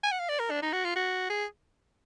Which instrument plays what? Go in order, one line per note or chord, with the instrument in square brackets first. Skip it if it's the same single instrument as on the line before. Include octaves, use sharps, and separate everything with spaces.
[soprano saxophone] G#5
F#5
F5
D5
A#4
D4
D#4
F#4
F4
F#4
G#4